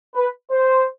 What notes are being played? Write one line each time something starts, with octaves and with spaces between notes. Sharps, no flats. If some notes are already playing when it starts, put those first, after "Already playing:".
B4
C5